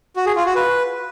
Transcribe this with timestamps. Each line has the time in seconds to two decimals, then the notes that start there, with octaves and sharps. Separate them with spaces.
0.16 F#4
0.26 G#4
0.36 F4
0.46 F#4
0.55 B4